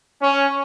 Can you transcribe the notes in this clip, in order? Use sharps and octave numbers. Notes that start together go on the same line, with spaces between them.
C#4